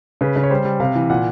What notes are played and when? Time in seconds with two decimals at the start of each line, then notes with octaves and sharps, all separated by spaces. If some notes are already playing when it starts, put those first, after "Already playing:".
0.21 C#3 B4
0.36 C#3
0.43 C#5
0.50 G3 C5
0.65 G3
0.80 C3 F5
0.95 E3
1.10 A#2 F#5